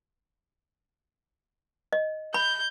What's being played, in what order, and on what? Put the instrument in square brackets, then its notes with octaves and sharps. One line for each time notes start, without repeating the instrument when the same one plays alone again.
[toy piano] D#5
[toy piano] B5 [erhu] G6